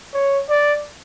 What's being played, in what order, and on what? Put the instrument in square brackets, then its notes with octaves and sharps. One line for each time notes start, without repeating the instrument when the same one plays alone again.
[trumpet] C#5
D5